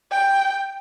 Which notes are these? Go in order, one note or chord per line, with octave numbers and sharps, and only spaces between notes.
G5